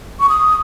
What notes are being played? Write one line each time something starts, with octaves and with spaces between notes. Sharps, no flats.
C#6
D#6